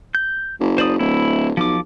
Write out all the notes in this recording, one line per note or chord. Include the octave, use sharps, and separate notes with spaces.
G6
F#1
C5 D5 D#6
D1 E4
B1 F3 D6